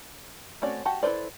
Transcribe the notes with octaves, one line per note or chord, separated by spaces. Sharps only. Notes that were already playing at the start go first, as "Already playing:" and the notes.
A3 C4 C#4 F#4 D5
F#4 G4 F#5 A5
E4 A4 B4 C5 D5